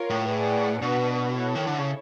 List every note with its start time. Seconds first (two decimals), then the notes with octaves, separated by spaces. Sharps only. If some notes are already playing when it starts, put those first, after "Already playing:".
Already playing: F4 A#4 C#5
0.10 A2
0.28 G#4 B4 D5 F#5
0.82 B2 D4 F#4 B4
1.36 E4 A4 C#5
1.55 D#3
1.67 D3
1.78 C#3